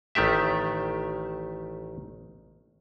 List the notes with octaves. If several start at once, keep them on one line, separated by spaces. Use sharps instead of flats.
A1 D#3 A3 G4 E5